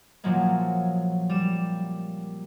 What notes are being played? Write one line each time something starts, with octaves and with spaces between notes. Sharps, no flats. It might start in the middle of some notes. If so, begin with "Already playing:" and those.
A#2 F3 F#3 G#3 A#3
G3 E7